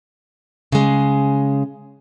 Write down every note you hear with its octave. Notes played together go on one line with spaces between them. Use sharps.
C#3 G#3